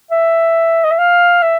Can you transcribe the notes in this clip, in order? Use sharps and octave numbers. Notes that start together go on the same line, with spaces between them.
E5
D#5
E5
F5
E5